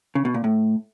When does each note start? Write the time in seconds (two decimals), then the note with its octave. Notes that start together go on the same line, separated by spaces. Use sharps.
0.15 C#3
0.25 B2
0.34 A#2
0.44 A2